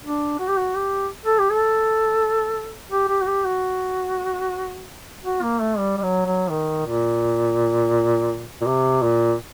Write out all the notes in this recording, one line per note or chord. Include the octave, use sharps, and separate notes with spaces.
D4
F#4
G4
F#4
G4
A4
G4
A4
G4
G4
F#4
G4
F#4
F#4
A#3
A3
G3
G3
F#3
F#3
D#3
A#2
A#2
C3
A#2